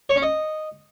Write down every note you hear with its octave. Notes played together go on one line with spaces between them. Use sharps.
C#5
C#4
D#5